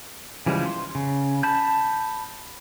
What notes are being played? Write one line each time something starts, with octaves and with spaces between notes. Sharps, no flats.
C#3 E3 F3 G3 G#3
C6
C#3
A5 B5 G6